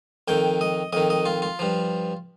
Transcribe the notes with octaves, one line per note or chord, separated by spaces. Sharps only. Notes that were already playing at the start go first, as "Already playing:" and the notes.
F2 D#3 G5
D#5
F2 D#3 D#5
D#5
F4
F4
G2 F3